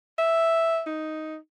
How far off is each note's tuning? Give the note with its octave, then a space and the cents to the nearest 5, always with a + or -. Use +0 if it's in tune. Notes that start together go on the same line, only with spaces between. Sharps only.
E5 +0
D#4 +5